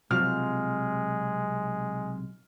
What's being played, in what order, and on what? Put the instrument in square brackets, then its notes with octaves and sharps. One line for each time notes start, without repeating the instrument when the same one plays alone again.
[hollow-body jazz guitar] B1 C3 D5 [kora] F3 F#3 [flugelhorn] G#3 [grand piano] F6